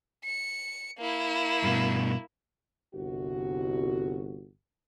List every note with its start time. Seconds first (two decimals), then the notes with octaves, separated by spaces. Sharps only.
0.25 C#7
0.98 A#3 E4
1.64 G2 B2
2.94 G1 C2 F#4